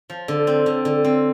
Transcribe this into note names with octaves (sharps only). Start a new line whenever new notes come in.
F3
D3
C4
D3
D3
C4